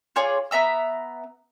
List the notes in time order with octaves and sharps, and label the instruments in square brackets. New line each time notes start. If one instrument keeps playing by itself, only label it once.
[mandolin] F4 G#4 C#5 D5
B3 E5 A#5 E6